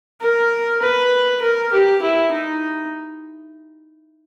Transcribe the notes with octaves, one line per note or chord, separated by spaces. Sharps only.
A#4
B4
A#4
G4
E4
D#4